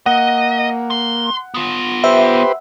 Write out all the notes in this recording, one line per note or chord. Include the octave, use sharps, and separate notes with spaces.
A#3 D#5 F#5
C6
B3 F4
G4 B4 C5 E5